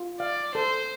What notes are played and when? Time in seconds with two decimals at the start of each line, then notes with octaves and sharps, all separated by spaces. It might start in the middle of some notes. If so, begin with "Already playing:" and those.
Already playing: F4
0.20 D5 F5
0.55 A4 C5